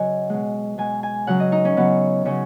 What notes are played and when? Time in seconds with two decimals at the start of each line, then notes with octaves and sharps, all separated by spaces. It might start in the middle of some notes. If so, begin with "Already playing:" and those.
Already playing: C#3 F#3 D#5 F#5 G#5
0.30 B2 G#3
0.78 B2 G#3 G#5
1.03 G#5
1.27 C#3 F#3 F#5
1.40 D#5
1.52 D#4
1.65 C#4
1.76 C#3 F#3 B3
2.25 C#3 F#3 C#4